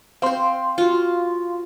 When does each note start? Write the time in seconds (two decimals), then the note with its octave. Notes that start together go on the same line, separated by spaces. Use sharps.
0.22 C4 C5 F5 C6
0.78 F4 F#4